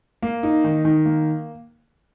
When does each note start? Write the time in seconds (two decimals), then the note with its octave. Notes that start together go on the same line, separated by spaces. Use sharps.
0.22 A#3
0.43 D#4
0.64 D#3
0.85 D#3
1.06 A#3